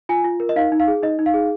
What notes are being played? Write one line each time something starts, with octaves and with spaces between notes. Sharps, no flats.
F4 G#5
F4
A#4
D#5
D#4 F5
D#4
F5
G#4
D#4 D#5
D#4
F5
G#4